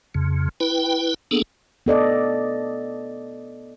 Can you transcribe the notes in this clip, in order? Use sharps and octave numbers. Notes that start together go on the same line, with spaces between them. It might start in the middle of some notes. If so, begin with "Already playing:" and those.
F2 C#3
E4 B4 G5
A#3 B3 D4 G#4 A4
B3 A4 D5 D#5